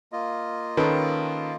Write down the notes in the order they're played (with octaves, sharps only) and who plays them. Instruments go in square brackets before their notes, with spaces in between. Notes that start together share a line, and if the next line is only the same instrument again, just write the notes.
[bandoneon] A#3 F4 D#5
[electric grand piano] D#3 [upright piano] C#4 A4 B4